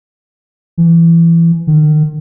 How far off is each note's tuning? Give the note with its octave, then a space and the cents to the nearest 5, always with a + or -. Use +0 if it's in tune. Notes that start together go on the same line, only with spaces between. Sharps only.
E3 +20
D#3 -35